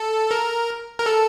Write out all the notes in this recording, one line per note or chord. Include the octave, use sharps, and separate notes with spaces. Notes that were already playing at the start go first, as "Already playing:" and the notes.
Already playing: A4
A#4
A#4
A4